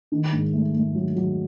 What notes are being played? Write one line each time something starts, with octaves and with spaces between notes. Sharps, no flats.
D#3
G#2
A3
A3
F#3
F#3